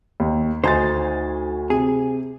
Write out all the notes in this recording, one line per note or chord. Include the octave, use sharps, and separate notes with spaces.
D#2
D2 D#4 C5 G#5 A6
C3 G#4